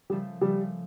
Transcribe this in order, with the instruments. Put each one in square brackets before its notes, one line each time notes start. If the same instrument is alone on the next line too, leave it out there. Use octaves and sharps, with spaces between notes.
[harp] C#3 F3 A3 [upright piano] G3
[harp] C#3 F3 A3 [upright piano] G3